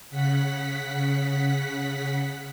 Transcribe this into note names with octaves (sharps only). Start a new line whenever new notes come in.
C#3 F#5 B6